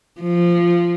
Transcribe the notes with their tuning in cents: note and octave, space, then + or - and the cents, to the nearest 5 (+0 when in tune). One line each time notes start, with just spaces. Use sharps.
F3 -10